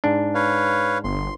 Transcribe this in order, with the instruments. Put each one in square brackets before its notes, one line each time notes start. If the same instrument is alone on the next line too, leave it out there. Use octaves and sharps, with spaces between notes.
[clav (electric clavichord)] G#2 D4
[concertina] B4 C#5 F5
[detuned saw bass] G1 [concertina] C6